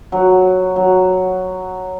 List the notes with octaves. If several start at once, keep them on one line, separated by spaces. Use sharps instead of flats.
F#3
F#3